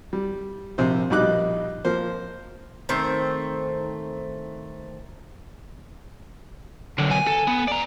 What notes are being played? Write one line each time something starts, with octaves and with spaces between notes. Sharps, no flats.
G3
A#1 C3 C5
A#1 B2 G3 D#4 D6 F#6
F3 A#3 C5
D#3 A3 C4
B1 F#2 D3
G#5
A4
B3
D5 A#5